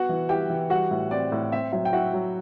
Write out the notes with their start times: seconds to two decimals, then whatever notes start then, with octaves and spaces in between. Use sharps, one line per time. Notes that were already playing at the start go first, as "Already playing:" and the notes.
Already playing: B3 F#4 F#5
0.09 E3
0.29 E4 G4 G5
0.50 E3
0.70 G3 F#4 F#5
0.91 A2
1.11 C4 D5
1.32 A2
1.52 C4 E5
1.72 F#3 E5
1.85 G5
1.93 E4 F#4 F#5
2.13 F#3